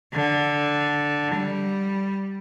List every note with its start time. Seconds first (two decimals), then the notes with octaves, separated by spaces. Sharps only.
0.14 D3
1.34 G3